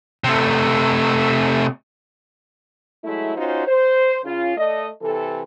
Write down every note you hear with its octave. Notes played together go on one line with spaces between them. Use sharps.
C3 A3
F#3 G#3 A3 E4
C#4 D#4 F4 F#4 C5
C5
C#3 F4
A3 D5 D#5
C3 E3 A4